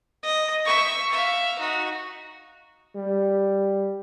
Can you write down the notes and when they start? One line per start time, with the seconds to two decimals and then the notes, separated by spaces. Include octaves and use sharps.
0.23 D#5
0.65 E5 C#6
1.11 E5 F5
1.59 D#4 F#4
2.96 G3